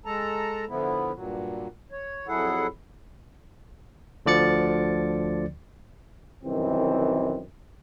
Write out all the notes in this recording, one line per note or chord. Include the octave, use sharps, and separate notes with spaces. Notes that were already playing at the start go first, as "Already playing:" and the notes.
G#3 A4 A5 A#5
D3 F3 B3 E4
G2 A#2 F#3
C#5
F2 F#3 E4 G#4 A4 F#5
D2 D3 F3 D5 A6 C#7
C2 F#2 D#3 E3 C4